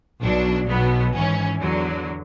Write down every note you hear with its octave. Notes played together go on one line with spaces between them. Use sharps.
B1 B2 F#3 D4
B1 B2 F#3 B3
G#1 G#2 E3 C#4
E2 D3 F#3